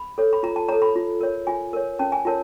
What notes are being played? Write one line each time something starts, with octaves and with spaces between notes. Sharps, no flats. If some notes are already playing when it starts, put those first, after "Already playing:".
Already playing: B5
A4 C#5
B5
F4 A#5
A5
A4 C#5 A#5
B5
F4
A#4 C#5
F4 G#5
A#4 C#5
C#4 A5
G#5
F4 A#4 C#5 A5